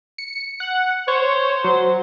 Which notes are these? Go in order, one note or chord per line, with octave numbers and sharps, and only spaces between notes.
C#7
F#5
C5 C#5
F#3